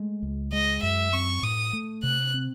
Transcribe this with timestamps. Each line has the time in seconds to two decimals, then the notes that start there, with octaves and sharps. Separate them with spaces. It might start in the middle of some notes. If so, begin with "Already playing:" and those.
Already playing: G#3 A3
0.22 C#2
0.53 G#3 D#5
0.83 F#2 E5
1.13 C4 C#6
1.43 A2 D#6
1.73 A3
2.03 C3 F#6
2.34 C4